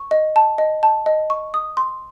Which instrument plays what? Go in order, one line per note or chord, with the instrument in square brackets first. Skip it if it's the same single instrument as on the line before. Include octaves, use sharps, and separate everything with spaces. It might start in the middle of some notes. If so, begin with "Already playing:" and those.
Already playing: [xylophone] C#6
D#5
A5
D#5
A5
D#5
C#6
D#6
C6